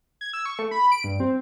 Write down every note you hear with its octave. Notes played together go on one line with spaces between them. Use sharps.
G#6
E6
C#6
A3
B5
D7
G2
C4